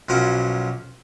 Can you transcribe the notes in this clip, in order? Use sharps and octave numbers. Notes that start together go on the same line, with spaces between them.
B1 F3 F#3 C#4 A#4 D6